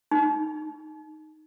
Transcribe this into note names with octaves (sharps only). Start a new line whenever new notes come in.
D#4